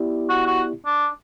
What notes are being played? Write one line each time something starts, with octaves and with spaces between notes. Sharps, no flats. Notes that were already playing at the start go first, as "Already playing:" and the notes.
Already playing: B3 E4 G4 D5
F#4
F#4
D4